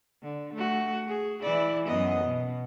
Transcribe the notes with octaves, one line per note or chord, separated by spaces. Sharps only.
D3
A3 F#4
G#4
E3 E4 D5
F#2 B3 D#5
B2